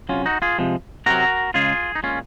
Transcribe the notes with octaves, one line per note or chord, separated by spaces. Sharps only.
C3 F#3 C#4 F4
D#4 F#4
F4 G#4
C3 F3 G#3
C3 F#3 F#4 A#4
C#3 G#3 F4 G#4
D#4
A#2 G#3 C#4 F4